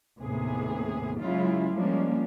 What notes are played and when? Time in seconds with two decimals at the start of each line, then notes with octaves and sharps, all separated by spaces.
0.20 D#2 A2 C3 B3 G#4
1.20 C#3 F#3 G#3 E4 F4
1.75 F3 G3 G#3 A#3 C#4 D4